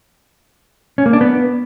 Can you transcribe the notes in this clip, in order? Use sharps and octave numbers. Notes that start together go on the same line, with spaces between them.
C#4
A#3
D4
B3